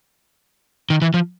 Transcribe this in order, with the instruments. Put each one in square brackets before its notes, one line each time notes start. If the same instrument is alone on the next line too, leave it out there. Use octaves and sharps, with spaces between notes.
[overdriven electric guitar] D#3
E3
F3